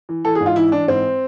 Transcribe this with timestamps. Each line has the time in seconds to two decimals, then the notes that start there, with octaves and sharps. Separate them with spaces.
0.09 E3
0.25 E3 A4
0.35 G#4
0.40 G#2
0.46 F4
0.56 E3 E4
0.72 E3 D4
0.88 G#2 C4